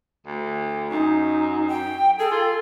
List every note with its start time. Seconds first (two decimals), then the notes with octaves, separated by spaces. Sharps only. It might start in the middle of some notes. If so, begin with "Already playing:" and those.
0.27 D2
0.91 F#2 D#4
1.68 G5
2.19 G#4 A4
2.31 F4